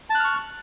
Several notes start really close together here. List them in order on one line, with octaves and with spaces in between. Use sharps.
A5 F#6 F6 C#6